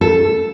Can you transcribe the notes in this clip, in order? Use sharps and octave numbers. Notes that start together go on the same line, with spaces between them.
A4